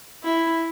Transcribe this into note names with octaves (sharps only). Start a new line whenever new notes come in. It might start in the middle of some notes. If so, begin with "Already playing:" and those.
E4